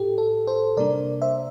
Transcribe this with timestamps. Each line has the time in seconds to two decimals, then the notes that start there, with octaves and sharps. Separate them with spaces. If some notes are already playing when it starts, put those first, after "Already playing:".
Already playing: A2 G4 A4
0.18 A4
0.47 A4 C5
0.77 C3 G3 A#3 D4 A#4 D5
1.22 C5 E5